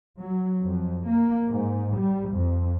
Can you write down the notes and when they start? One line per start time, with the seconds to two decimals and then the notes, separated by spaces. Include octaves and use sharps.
0.20 F#3
0.62 F2
1.08 A#3
1.50 G#2
1.99 G3
2.32 F2